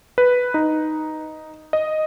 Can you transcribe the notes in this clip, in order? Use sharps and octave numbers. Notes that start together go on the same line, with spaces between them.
B4
D#4
D#5